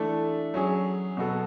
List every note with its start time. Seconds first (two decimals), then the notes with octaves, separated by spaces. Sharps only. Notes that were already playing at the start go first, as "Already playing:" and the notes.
Already playing: E3 A3 D4 A4
0.54 F#3 C#4 G#4
1.17 B2 F#3 B3 F#4 A4